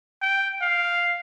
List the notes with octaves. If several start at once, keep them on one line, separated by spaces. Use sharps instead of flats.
G5
F5